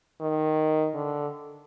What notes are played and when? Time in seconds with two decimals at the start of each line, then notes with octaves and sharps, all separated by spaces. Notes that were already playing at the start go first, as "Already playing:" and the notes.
0.21 D#3
0.94 D3